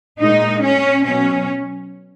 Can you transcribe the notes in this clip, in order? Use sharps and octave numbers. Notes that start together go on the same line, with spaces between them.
A#2 G#3 D#4
C#4
B2 F#3 C#4